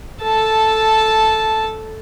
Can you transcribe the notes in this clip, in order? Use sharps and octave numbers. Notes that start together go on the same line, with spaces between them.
A4 A5